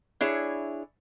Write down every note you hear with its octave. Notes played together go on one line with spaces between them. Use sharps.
D4 E4 G#4 C#5